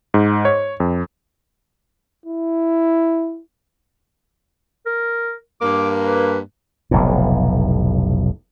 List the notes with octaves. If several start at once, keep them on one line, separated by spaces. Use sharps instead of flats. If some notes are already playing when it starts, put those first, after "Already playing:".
G#2
C#5
F2
E4
A#4
G2 A#3 D6
B4
F1 B1 A2